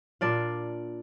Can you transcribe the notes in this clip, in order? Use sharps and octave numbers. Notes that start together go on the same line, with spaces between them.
A#2 D4 D5 F5